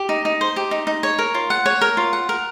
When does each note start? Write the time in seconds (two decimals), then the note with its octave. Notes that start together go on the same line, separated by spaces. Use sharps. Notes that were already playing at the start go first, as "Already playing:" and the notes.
Already playing: G4
0.09 D#4
0.25 D#4
0.41 C5
0.56 G4
0.71 D#4
0.87 D#4
1.03 C#5
1.19 A#4
1.34 F4
1.50 F#5
1.66 C#5
1.81 A#4
1.97 F4
2.13 F#5
2.29 A#4